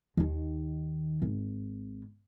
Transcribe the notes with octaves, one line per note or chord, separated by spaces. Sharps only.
D#2 D#3
G#1